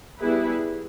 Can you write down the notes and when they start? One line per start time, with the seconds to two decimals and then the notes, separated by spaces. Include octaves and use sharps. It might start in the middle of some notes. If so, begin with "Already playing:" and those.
0.19 G3 B3 E4 G#4 B4